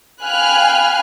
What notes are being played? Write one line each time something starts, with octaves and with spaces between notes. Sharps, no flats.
F5 G5 G#5 B5 F6 F#6